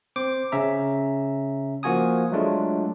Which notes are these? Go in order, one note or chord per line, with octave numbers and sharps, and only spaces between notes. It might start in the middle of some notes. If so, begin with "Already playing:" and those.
C4 C5 D6
C#3 C#4 E5 A#5
F3 A#3 F#4 G#5 D#6
F#3 G#3 A3 D4 F4